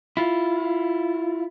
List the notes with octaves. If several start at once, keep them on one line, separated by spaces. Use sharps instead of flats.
E4 F4